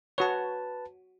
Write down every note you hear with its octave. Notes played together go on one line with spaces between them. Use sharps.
F#4 B4 C#5 A5